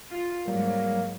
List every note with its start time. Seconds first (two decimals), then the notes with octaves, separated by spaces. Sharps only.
0.11 F4
0.48 G#2 F#3 G3 A#3